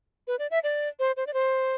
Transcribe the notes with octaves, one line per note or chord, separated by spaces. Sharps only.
B4
D5
E5
D5
C5
C5
D5
C5